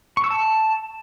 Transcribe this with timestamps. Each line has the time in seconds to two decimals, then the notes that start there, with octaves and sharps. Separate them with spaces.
0.17 C#6
0.24 E6
0.30 A5